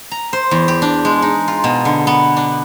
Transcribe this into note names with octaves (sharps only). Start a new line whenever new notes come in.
A#5
C5
E2
G4
D4
G#3
D#4
F4
B2
D3
B3
D4